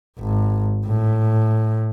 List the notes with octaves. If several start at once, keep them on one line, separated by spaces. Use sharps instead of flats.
G#1
A2